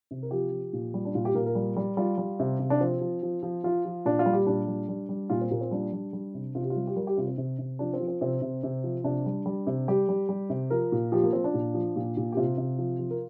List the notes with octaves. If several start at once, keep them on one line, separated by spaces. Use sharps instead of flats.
C3
A#4
F3 G4
F3
A#2
G3
D4
A#2 F4
G4
A#2 A#4
A#4
G3
G3
G3 F4
G3
C3
C3
D4
F3 C4
F3
F3
F3
F3 F4
F3
A#2 D4
F4
G3
G4
A#2 D4
G3
G3
G3
A#2 F4
C4
A#2 A#3
C4
G3 D4
G3
G3
C3
C3 F4
G4
F4
G3
G4
G3 A#4
G4
C3 F4
C4
C3
C3
F3 D4
C4
F3
C4
C3 C4
C3
C3
F3
C3 D4
G3
G3
C3
G3 G4
G3
G3
C3
F3 A#4
A#2
F3 G4
A#3
F3 C4
D4
A#2
F3
A#2
A#2
G4
C3 F4
C3
F3
F3
A#4